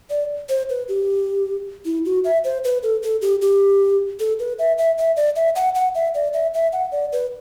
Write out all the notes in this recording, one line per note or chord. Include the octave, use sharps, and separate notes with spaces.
D5
C5
B4
G4
E4
F#4
E5
C5
B4
A4
A4
G4
G4
A4
B4
E5
E5
E5
D5
E5
F#5
F#5
E5
D5
E5
E5
F#5
D5
B4